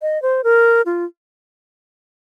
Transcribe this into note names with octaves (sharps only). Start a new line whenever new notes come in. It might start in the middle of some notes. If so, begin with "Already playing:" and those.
D#5
C5
A#4
F4